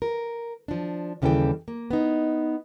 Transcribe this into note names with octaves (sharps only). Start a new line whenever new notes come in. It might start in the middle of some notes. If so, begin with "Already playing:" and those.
A#4
F3 D4
D#2 C#3 E3 G3 A4 G5
A#3
B3 D#4